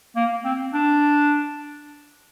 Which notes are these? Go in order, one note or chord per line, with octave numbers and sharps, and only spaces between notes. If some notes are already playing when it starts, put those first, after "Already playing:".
A#3
C4
D4